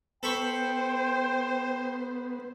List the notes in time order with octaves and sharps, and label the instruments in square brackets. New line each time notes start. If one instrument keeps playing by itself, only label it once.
[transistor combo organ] B3 [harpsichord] A4 B5 C#6 [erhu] C5 [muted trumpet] G5